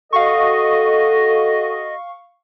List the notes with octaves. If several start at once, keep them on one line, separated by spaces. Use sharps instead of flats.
F#4 A4 D#5 F5 C#6